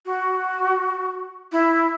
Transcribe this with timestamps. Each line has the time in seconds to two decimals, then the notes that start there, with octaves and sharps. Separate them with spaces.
0.06 F#4
1.52 E4